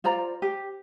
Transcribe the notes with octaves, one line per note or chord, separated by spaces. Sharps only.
F4 C5 D5 A#5
G4